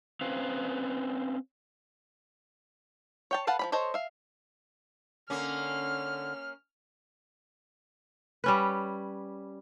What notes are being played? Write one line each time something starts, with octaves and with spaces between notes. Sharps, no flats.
C4 C#4 B4 C5 F5
C#5 G5 A5
A4 B4 F5 F#5 A5
F3 C#4 B5
A4 C5 C#5 D#5
E5 F5
D3 A#3 C#4 F6
G3 C#4 B4